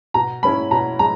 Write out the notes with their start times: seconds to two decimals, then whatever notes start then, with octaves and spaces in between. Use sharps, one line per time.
0.14 B2 A#5
0.43 G#3 C#4 E4 B5
0.71 B2 A#5
0.99 G#3 A#5